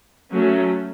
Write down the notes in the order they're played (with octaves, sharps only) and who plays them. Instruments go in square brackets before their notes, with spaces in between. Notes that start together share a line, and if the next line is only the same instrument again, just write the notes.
[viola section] F#3 A3 C#4